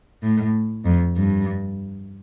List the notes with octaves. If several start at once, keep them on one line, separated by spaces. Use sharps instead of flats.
A2
F2
G2